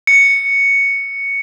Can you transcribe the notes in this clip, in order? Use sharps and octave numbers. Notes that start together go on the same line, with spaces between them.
C#7